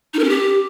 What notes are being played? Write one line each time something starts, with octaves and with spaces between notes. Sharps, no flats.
D#4
A#4
C#4
G4